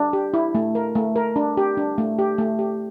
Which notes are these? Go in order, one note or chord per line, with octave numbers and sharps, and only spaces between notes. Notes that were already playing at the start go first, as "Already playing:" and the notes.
Already playing: D4
G4
E4
A3
A#4
A3
A#4
D4
G4
D4
A3
G4
A3
G4